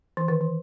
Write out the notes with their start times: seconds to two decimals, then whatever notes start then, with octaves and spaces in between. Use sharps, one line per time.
0.17 E3
0.28 D#3
0.41 E3